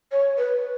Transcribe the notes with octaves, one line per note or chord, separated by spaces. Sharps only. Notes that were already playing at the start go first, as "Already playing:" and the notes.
C#5
B4